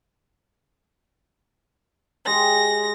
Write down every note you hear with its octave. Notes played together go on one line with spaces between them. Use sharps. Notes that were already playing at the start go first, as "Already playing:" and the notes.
G#3 G4 A#6